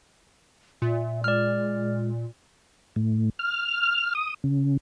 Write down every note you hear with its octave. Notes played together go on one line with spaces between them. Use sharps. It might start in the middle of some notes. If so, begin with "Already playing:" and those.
A#2 E5
G#3 D5 F6
A2
F6
D#6
C#3